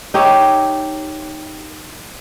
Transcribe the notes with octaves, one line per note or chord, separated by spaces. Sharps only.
D#4 G4 C#5 E5